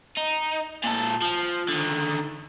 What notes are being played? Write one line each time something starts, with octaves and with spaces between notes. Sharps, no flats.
D#4
A#2 A4
F3
D3 D#3